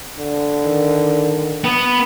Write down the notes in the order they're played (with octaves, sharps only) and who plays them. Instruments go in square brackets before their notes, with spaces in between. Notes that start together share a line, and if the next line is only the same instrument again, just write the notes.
[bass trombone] D3
[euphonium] D#3
[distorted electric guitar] B3